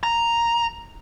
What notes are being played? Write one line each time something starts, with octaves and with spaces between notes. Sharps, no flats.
A#5